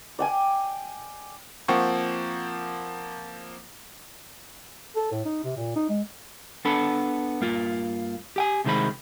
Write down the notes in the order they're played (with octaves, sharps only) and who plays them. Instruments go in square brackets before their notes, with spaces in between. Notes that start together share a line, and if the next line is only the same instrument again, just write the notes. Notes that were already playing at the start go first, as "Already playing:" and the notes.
[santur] D5 G5 G#5
[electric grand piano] F3 A#3 C4 F#5 G5 C#6
[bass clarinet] A4
A2
D#4
C3
A#2
D#4
G#3
[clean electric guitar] B3 D4 A4 B5
G2 A#3 F4
G4 G5 G#5
C2 C3 D#3 G#3 C5 B5